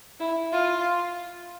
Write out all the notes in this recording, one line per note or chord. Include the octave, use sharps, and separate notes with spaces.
E4
F4